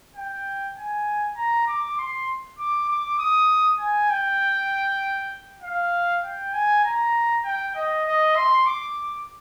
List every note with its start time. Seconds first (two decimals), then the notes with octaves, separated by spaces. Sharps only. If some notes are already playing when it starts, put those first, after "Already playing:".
0.15 G5
0.76 G#5
1.36 A#5
1.67 D6
1.98 C6
2.59 D6
2.89 D6
3.19 D#6
3.80 G#5
4.10 G5
5.63 F5
6.24 G5
6.53 G#5
6.84 A#5
7.45 G5
7.76 D#5
8.06 D#5
8.36 C6
8.66 D6